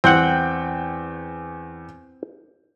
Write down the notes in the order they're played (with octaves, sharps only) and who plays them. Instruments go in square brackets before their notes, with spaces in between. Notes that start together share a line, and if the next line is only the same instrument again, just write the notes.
[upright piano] E2 G5 G6 [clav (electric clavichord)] C4 F#5